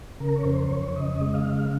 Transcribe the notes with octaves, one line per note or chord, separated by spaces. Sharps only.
C#3 A#4
C#5
F2 C5
F2 C#5
C#3 D#5
G#3
F5
C#3